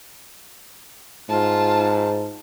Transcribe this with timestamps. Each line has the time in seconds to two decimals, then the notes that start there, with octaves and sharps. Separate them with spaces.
1.29 G#2 F4 A5